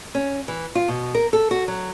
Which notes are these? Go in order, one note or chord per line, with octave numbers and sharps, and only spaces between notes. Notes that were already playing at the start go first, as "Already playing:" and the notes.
C#4
E3
F4
B2
A#4
A4
F#4
F#3